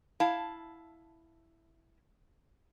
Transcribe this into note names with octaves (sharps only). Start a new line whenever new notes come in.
E4 F5 A5